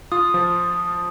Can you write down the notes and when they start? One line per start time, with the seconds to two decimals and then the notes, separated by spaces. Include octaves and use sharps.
0.12 F4 D#6
0.34 F3